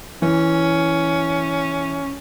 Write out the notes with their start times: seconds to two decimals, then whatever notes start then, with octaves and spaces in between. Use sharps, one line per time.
0.22 E3 C#4